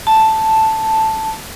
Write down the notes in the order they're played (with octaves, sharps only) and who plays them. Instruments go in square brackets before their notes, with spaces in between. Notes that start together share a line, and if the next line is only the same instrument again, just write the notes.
[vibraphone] A5